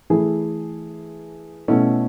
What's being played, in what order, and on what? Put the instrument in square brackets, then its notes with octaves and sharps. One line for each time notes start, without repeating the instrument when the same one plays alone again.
[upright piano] E3 A3 E4 G#4
B2 A3 C#4 E4